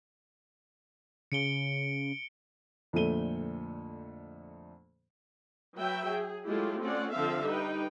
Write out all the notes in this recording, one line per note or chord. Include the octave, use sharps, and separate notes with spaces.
C#3 C#7 D7 G7
F2 A#2 D3 A3 D#7 G7
F#3 B4 E5 G5
G#4
F#3 G#3 A3 E4 F4 G4
A3 C4 C#4 F4 D5 F#5
D3 F3 C4 A4 E5 F5
G3 D#4 B4 G5